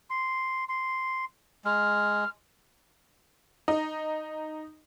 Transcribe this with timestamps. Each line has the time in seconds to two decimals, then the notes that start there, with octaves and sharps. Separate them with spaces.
0.10 C6
0.69 C6
1.65 G#3 F6
3.68 D#4